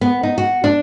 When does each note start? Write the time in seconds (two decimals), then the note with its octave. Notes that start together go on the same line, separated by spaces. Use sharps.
0.01 B3
0.23 D#4
0.38 F#4
0.64 D4